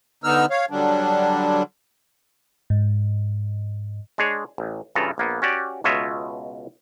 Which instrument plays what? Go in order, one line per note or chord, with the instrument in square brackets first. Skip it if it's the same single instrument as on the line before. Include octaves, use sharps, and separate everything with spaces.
[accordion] D3 B3 D#4 E6 F6
C#5 F5
D3 F#3 G3 D4
[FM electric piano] G#2
[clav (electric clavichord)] G#3 D4 G#4 C#5
A1
G2 C#3 E3 F4 A4 A#5
A#1 A#3 B3
C#4 F#4 G4 D5
C#2 B2 F4 C#5 D#5 E5